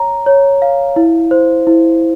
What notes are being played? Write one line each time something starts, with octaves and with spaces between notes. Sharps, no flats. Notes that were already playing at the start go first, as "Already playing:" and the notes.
Already playing: C#5 A#5
C#5
F5
E4
C5
E4